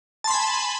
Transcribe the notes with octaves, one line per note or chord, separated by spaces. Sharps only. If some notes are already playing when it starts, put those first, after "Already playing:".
G#5 A5 B5 C6